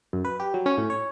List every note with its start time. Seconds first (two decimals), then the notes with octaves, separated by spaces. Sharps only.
0.13 F#2
0.25 B4
0.40 G4
0.54 F#3
0.66 C#4
0.78 A2
0.90 C#5